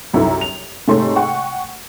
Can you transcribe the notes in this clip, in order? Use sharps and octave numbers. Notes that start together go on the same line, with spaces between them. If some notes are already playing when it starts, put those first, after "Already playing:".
C2 F#2 D#4 E4 A4
F7
G#2 C3 G#3 A3 C#5 C6
F#5 G5 C#6